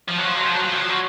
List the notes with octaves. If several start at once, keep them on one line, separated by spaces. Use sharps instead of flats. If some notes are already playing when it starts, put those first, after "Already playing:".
F3
F#3
F3
F#3
F3
F#3
F3
F#3
F3
F#3